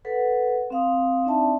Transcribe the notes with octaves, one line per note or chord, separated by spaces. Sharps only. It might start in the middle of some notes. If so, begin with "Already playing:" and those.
A4 B4 F#5
C4 F5 D#6
C4 D4 D#4 D5 E5 A5